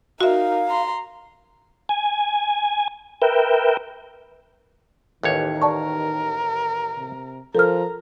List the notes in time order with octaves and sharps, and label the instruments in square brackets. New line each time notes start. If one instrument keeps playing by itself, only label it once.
[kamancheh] D#4 A#4 [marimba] F#4 E5 [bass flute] F5
[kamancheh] A#5 C6
[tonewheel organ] G#5
A#4 B4 E5 G5
[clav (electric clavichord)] A1 D#2 C#5 [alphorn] D#3
[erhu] A#4 [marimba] D5 A5 C#6
[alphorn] C3
[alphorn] F3 [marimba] A4 A#4 F6 [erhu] A#5